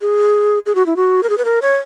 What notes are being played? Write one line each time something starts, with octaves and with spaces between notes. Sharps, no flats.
G#4
G#4
F#4
E4
F#4
A#4
G#4
B4
A#4
C#5